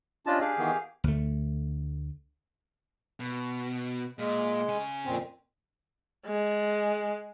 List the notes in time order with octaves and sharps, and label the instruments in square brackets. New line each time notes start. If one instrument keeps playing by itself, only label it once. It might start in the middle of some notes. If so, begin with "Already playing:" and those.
[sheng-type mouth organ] C#4 G4 D#5 [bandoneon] D4 F4 A5
[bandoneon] D4 [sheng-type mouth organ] G4 G#4 F5
[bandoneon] D#3 E3 B3
[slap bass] D2 A3
[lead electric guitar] B2
[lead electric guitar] A#2 [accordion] G#3
[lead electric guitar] C#3 G#5
[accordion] F2 A#2 C4
[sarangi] G#3